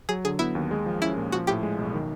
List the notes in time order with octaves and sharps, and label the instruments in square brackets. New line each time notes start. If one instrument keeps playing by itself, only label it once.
[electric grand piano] F#3 [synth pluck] G#4
[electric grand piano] D3 [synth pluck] G#4
[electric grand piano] B3 [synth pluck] E4
[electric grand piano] D#2
G#3
F3
[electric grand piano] C#4 [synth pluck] E4
[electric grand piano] A#2
[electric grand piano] F3 [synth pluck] F#4
[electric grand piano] A2 [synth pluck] G4
[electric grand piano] G#3
B1
D#3